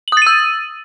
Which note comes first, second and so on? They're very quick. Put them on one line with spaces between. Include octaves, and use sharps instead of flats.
F#7 D#6 A6 D#7 E6